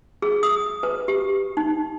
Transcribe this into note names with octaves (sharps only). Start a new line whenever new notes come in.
G#4
D#6
B4
G4
D#4